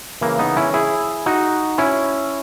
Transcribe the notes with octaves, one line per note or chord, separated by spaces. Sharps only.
C#3 E3 A#3
B3 D#4
C#4 E4
E4 G#4
D#4 F#4
C#4 E4